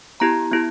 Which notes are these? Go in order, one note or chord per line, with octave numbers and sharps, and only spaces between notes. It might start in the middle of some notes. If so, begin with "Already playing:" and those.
B3 E4 G4 A#5
B3 E4 G4